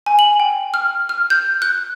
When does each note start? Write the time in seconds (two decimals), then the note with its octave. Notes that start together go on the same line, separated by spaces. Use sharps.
0.06 G#5
0.19 F#7
0.40 G5
0.74 F6
1.09 F6
1.30 G6
1.62 F#6